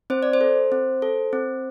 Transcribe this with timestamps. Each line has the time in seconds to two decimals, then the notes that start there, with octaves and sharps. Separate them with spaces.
0.10 C4 C5
0.23 D5
0.33 C5
0.41 A4
0.72 C4
1.02 A4
1.33 C4